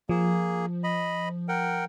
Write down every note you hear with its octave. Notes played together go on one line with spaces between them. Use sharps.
F3 A#3 G#4
D#5 B5
A#4 F#5 G5